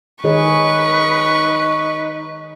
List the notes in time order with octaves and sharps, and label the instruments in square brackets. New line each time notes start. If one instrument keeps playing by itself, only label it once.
[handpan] D#3 G#4 C#5 [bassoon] D#4 [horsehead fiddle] B4 [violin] C#6